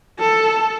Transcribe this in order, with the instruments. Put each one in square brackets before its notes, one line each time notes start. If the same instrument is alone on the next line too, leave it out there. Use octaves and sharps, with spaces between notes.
[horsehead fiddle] A4